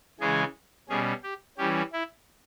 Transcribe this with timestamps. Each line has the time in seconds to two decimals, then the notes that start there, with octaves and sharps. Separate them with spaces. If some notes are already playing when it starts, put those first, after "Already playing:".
0.20 C#3 E3 G#3 C#4 G#4
0.89 B2 G3 C#4 G#4
1.23 G4
1.58 E3 G3 C#4 G4
1.92 E4